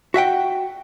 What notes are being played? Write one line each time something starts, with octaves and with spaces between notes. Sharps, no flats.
F#4 E5 F#5 G5